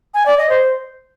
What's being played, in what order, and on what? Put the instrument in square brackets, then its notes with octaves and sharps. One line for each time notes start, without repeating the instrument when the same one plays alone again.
[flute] G#5
D5
D#5
C5